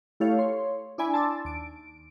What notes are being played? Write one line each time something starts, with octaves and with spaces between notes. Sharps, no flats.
A3 E4 G4 A4 C#5 F5
C#5 C6
D4 E4 D5 G#5 B5
A5 C6 D6 E6 A6
D#2 D7